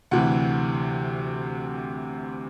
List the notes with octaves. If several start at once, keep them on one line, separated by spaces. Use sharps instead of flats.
D2 C3 E3 F#5